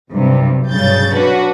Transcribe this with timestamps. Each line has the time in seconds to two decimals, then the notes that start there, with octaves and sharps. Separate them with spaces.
0.10 B1 G2 C3
0.70 B1 G2 C#3 G6 A6
1.15 C#4 D4 F#4 B4